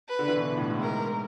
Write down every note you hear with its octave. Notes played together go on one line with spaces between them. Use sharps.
B4
D3
E3
B2
A2
G#2
G#2 A#4